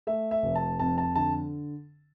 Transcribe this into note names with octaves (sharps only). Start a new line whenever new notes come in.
A3 E5
E5
F1
A5
F2 A5
A5
D3 A5